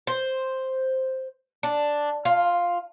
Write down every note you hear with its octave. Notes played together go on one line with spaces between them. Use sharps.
C5
D4
F4